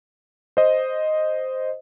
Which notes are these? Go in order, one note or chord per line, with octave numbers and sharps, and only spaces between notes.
C5 D#5